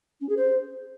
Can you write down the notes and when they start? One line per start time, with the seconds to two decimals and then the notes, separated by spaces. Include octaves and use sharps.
0.20 C#4
0.28 G#4
0.37 C5